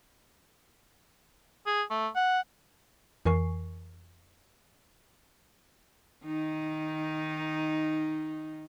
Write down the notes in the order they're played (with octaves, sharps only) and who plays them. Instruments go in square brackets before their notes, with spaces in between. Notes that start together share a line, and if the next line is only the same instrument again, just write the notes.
[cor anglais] G#4
A3
F#5
[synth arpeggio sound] F2 E3 A#4 G#5 C#6 C7
[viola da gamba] D#3 D#4